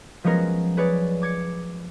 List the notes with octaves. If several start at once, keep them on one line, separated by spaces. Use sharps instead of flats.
F3 F#3 G#3 B3 C#4 A#4
G#4 B4 C#5 D5
D6 G#6 C#7